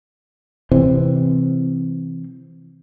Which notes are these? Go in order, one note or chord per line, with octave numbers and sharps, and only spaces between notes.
C3 E3 C4